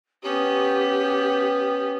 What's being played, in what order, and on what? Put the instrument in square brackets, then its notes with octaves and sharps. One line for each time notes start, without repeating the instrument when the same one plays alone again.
[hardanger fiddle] B3 C#4 [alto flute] G4